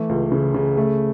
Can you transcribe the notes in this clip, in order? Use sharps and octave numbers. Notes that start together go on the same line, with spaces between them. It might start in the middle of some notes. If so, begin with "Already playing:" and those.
Already playing: E3 A3
C#2
C#3
C#3
A3